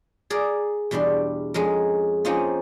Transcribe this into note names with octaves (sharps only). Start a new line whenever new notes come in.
G#4 A#4 D5
E2 B2 G3 D4 C6
F2 G#3 C#4 A#4
F3 A#3 C4 C#4 D#4 F4